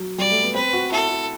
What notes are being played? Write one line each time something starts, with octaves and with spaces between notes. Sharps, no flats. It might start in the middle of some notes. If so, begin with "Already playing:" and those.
Already playing: F#3
G3 D5
A3
B3
C4 B4
F#4
E4 A4
E4